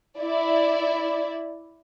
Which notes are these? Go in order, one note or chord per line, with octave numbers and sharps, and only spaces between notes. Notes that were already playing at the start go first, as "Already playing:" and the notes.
E4 D5